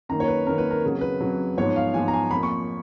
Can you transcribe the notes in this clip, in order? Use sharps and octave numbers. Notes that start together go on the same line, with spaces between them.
F#2 D#3 A#3 A#5
C#5
B4
F#2 D#3 A#3 A#4
B4
A#4
F2 C#3 F#3
B4
F2 C#3 F#3
G#2 F3 B3 C#5
F5
G#2 F3 B3 G#5
A#5
G#5
F2 F3 A#3 B5
C#6